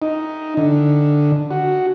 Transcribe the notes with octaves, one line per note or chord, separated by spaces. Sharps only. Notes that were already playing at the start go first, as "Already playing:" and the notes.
D#4
D3
F#4